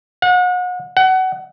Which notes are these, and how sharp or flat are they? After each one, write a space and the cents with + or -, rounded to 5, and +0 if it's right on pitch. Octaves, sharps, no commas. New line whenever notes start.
F#5 -35
F#5 +25